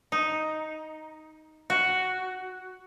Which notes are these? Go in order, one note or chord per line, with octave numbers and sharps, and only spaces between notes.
D#4
F#4